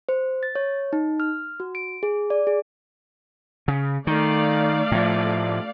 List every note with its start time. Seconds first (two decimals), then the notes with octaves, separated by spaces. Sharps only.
0.09 C5
0.43 A6
0.55 C#5
0.93 D#4
1.20 F6
1.60 F#4
1.75 D7
2.03 G#4
2.30 D5
2.47 G#4
3.68 C#3
4.07 D#3 A3 D5 F5
4.92 A2 F3